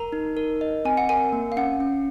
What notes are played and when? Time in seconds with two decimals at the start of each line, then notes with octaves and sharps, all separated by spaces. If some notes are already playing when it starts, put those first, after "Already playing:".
Already playing: A#4 A#5
0.12 D#4
0.37 A#4
0.61 D#5
0.85 C4 G#5
0.97 F#5
1.09 A#4 G#5
1.32 A#3
1.52 F5
1.57 C#4 F#5
1.80 C#4